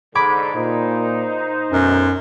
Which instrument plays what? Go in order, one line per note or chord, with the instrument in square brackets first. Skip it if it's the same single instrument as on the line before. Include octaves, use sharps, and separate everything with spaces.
[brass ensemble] G#2 D3 [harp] B5 D6 G#6
[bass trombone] A#2 [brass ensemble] D#4 C5
[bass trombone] B1 [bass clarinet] F#2